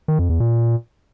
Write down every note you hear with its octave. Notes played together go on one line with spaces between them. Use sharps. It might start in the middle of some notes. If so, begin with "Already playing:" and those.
D#3
F2
E2
A#2